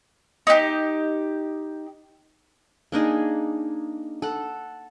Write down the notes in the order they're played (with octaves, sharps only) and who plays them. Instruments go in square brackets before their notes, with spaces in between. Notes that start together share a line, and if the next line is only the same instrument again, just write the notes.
[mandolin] D#4 G4
[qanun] A#3 D4 D#4 G#4
A4 F#5